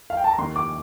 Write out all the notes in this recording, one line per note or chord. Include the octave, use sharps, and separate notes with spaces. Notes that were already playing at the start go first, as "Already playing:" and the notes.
F5
G5
A5
A#5
D#2 C6
D6